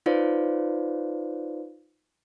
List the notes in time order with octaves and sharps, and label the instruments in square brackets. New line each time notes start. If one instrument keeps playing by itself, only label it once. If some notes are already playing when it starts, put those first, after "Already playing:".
[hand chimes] D#4 F4 B4 C5 D5 F5